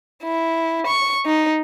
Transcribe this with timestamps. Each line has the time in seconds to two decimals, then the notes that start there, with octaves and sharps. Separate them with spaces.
0.24 E4
0.87 C#6
1.26 D#4